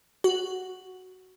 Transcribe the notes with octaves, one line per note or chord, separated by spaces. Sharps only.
F#4